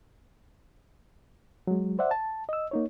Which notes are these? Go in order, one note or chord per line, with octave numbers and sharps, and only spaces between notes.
F#3 G#3
C5 D5 E5 F#5
A5
D#5 E6
A#3 D#4 C#5